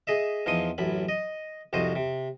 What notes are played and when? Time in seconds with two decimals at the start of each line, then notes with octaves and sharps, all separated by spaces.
0.07 G#4 D#5 E5
0.46 E2 F3 D#4 C6 D#6
0.78 A1 F#2 B5
1.09 D#5
1.73 C2 F2 F#4 C5 D#5
1.95 C3